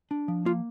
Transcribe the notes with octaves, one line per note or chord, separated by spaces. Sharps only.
D4
F3
A#3 F4